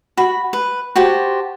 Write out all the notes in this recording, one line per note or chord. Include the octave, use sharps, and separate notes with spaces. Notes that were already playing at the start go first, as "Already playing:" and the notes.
F#4 B5
B4
F#4 G4 C5 A5